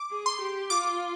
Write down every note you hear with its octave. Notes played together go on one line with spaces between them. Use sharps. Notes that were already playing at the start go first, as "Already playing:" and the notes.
Already playing: D6
G#4
C6
G4
F4 D6